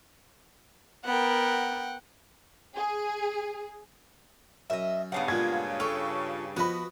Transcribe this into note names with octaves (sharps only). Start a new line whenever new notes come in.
B3 A#4 F#5 G5
G#4
F#2 D#5 E5
G2 C#3 B3 F5 F#5
A#2 G#3 F4 G#6
F4 A4 C#6
F3 B3 F#4 B4 D#5 B5